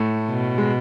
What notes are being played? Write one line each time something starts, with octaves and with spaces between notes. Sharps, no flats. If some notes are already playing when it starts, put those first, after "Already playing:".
Already playing: A2 A3
B2
G#3